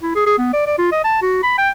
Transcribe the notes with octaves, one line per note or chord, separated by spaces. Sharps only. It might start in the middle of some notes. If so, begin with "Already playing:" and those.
E4
G#4
G#4
B3
D5
D5
F4
D#5
A5
F#4
B5
G5